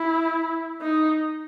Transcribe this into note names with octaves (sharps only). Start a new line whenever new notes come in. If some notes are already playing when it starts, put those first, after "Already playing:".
Already playing: E4
D#4